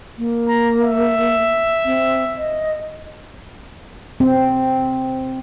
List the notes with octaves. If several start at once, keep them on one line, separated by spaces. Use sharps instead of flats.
A#3
A#5
E5
C4
D#5
C4